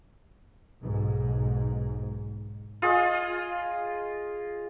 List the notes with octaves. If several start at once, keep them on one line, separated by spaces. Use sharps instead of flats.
B1 G#2
F4 G#4 D#5